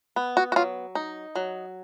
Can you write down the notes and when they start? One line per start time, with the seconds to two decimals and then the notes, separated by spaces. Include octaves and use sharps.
0.16 B3
0.37 F#4
0.52 F#4
0.56 F#3 F4
0.95 D#4
1.35 F#3